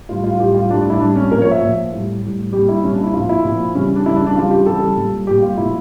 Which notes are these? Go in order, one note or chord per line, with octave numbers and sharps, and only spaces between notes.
A2 G3 F4
F4
A2 G3 G4
F4
A2 G3 D4
D4
E4
A2 G3 D4
C#4
A#2 F3 A#4
C#5
E5
A#2 F3
A2 G3
A2 G3
A#2 G3 G4
E4
A#2 G3 C#4
D4
E4
A#2 F3 F4
E4
A#2 F3
C#3 E3 G3 C#4
D4
C#3 E3 G3 E4
D4
D4
C#3 E3 G3 F4
G4
C#3 E3 G3 A4
A#2 G3
A#2 G3 G4
F4
A#2 F3 E4